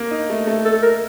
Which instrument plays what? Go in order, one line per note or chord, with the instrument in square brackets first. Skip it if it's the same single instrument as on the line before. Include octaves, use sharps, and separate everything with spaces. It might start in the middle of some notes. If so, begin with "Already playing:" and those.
Already playing: [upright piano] A#3
D#4
A3
A3
[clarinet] A4
A#4